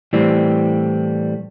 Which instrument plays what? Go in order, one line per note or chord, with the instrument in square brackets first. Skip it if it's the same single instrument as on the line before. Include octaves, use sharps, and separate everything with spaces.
[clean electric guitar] A2 E3 G3 C4